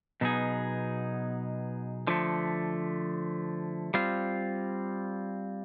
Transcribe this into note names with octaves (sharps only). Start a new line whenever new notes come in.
B2 F#3 B3 D#4 G#4
D3 F3 A3
G3 C4 F4